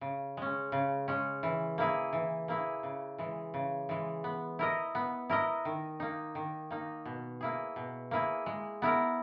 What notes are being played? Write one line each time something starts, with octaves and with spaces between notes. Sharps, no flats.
C#3
G#3 C#4
C#3
G#3 C#4
E3
A#3 E4 G#4
E3
A#3 E4 G#4
C#3
E3 G#3
C#3
E3 G#3
B3
E4 A#4 D#5
B3
E4 A#4 D#5
D#3
A#3 D#4
D#3
A#3 D#4
B2
A#3 E4 G#4
B2
A#3 E4 G#4
G#3
B3 E4 A#4